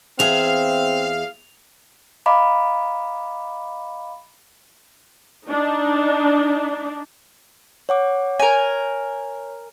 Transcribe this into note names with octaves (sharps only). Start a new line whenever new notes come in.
E2 C4 G#4 E5 F5 F7
D#5 F5 A#5 B5 D6
D4 D#4
C#5 F#5 D6
A#4 C#5 G#5